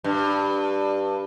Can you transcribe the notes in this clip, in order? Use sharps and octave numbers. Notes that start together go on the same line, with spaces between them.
G2